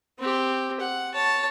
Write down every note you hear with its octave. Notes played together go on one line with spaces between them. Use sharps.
C4 G4
F#5
C#5 A5